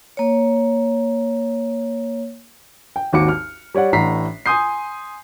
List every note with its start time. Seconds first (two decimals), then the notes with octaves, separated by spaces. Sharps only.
0.17 A#3 C#5
2.96 G5
3.13 G#1 D#2 F#4 D6 C#7
3.29 F6
3.74 G3 C#5 D5 F#5
3.93 A1 A2 D4 A#5 B6 C7
4.46 G#5 C6 D#6 G6 C7